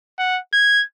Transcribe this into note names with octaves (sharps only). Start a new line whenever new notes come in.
F#5
G#6